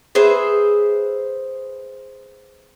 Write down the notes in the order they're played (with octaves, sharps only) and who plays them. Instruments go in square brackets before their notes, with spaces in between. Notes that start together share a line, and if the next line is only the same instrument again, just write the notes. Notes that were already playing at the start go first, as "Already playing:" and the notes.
[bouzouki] G#4 B4 C5 E5